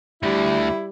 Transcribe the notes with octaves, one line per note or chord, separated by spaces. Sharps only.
D2 D3 G3 E4